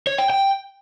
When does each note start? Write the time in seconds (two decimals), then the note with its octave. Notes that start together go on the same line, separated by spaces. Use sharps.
0.07 C#5
0.18 G5
0.30 G5